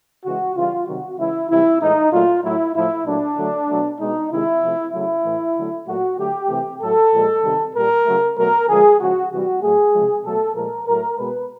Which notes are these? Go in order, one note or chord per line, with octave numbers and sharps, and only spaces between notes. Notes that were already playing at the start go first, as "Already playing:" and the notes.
C#3 E3 G#3 F#4
C#3 E3 G3 F4
C3 D#3 F#3 F#4
C#3 E3 G#3 E4
C3 E3 G3 E4
A2 E3 G#3 D#4
A#2 F#3 A3 F4
A2 F#3 A3 E4
A2 F3 A3 E4
A#2 F#3 A3 D4
D3 F#3 A3
B2 F#3 A3
B2 G#3 D#4
C3 D#3 G#3 E4
C3 F3 A3
C#3 F#3 A3 E4
A2 E3 A3
D3 F#3 A3
A#2 F#3 A3 F#4
D3 F#3 A3 G4
C3 E3 A3
A2 F#3 A3 A4
A#2 F3 G#3
C3 D#3 G3
A#2 G3 A#4
C#3 F#3 A3
B2 F#3 A3 A#4
D3 F3 G#3 G#4
C#3 F3 G#3 F#4
C3 E3 G3 F#4
A2 F#3 A3 G#4
C3 F3 G#3
B2 F#3 A3 A4
A#2 F3 G#3 A#4
A2 F#3 A3 A#4
B2 G#3 B4